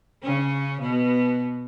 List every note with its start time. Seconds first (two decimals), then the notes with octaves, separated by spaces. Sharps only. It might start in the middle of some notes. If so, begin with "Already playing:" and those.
0.23 C#3 C#4
0.81 B2 B3